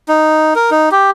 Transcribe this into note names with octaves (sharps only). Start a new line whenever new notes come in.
D#4
A#4
D#4
G4